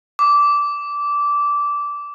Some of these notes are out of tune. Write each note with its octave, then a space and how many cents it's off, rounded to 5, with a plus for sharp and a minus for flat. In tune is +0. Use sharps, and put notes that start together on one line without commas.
D6 -15